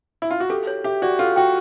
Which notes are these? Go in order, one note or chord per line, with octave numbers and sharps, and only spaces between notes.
E4
F4
F#4
G4 A4
C#5
G4 E5
F#4 D5
F4 A4
F#4 G5